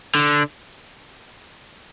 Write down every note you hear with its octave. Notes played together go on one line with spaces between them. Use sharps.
D3